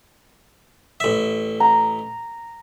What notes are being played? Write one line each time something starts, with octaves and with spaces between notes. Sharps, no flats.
A1 E5
A#5